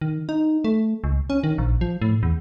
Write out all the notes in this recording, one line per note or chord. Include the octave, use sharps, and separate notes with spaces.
D#3
D#4
A3
C#2
C#4
D#3
A#1
F3
A2
E2